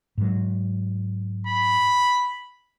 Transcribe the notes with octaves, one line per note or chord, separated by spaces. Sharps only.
G#2 F#3
B5